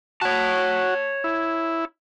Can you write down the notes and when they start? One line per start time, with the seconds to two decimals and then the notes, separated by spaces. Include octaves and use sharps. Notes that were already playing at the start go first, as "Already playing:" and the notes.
0.21 F#4 C#5 A5
1.24 E4